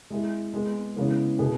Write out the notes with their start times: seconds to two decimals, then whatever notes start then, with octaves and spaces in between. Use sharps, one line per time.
0.10 G#3 E4 G#4
0.54 G#3 B3 G#4
0.96 C#3 E3 G#3 B3
1.39 B2 B3 G#4